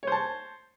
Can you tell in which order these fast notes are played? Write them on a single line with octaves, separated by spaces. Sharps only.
C#5 C5 A5